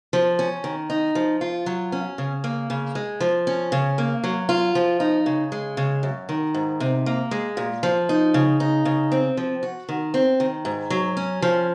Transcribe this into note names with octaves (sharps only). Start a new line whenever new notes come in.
F3
C#4
D#3
D#4
F3
F4
F#3
C#4
C#3
A#3
C#3
G#3
F3
C#4
C#3
A#3
F#3
F4
F3
D#4
C#3
G#3
C#3
F#2
D#3
G#2
C3
A#3
G#3
A#2
F3
D#4
C#3
D#4
C#3
C4
F3
F#4
D#3
C4
D#3
G#2
F#3
C#4
F3